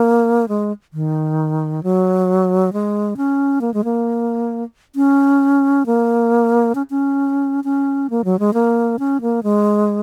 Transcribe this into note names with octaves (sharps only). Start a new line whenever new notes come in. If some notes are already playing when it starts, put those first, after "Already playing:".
Already playing: A#3
G#3
D#3
F#3
G#3
C#4
A#3
G#3
A#3
C#4
A#3
C#4
C#4
C#4
A#3
F#3
G#3
A#3
C#4
A#3
G#3